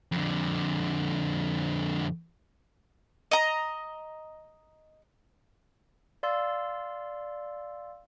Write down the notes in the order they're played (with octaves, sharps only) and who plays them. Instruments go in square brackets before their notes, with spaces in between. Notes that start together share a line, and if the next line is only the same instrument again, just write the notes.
[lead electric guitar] F2 D3
[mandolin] D#5 A#5
[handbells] D5 F5 C6 E6 A6